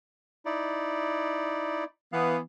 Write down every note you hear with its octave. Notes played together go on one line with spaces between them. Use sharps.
D#4 E4 D5
E3 B3 F5